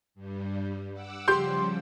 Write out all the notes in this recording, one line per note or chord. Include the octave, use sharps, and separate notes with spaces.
G2 G3
F#5 D6 E6
C#3 F3 G3 G4 C6 G6